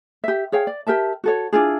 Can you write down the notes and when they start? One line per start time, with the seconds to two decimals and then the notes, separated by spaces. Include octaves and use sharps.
0.24 G4 E5
0.52 G#4 C#5 F5 G5
0.67 D5
0.87 G4 A#4 E5 A5
1.24 F#4 A4 C#5
1.53 D4 E4 F4 G#4